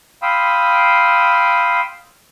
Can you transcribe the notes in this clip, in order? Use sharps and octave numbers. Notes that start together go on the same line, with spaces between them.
F5 G5 B5 C6 D#6 E6